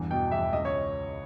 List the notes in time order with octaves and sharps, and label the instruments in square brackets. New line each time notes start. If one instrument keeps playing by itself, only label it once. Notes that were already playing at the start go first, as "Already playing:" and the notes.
Already playing: [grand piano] E2 G2
B2 G5
E2 E5
C#2 D#5
C#5